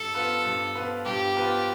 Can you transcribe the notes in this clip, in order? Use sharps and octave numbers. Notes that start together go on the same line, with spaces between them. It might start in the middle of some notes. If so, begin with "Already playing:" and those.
Already playing: G2 A4
F3 B3 F4 B4
G2
F3 B3 F4 B4
G2 G4
F3 B3 F4 B4